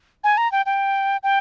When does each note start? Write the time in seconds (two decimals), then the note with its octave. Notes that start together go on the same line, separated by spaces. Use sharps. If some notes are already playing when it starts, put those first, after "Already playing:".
0.24 G#5
0.37 A#5
0.52 G5
0.66 G5
1.23 G5